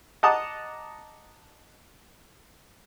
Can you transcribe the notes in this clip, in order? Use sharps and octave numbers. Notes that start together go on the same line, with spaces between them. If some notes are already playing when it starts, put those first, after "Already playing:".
D#5 F#5 A5 A#5 D6 D#6